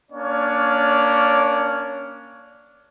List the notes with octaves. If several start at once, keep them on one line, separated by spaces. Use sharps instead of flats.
A#3 C#4 D4 C#5 D5